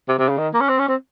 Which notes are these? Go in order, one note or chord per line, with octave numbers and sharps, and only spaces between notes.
C3
C3
C#3
D#3
A#3
C#4
C4
C#4
C4